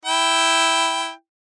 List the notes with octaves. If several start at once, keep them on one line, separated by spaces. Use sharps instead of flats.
E4 G5